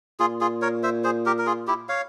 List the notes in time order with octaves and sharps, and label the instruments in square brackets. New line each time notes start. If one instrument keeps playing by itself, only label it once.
[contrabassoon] A#2 [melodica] F4 G#4
[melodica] F4 G#4
A#4 C#5
C5 E5
G#4 C5
G4 A#4
A#4
F4 G#4
E4 G4
C#5 F5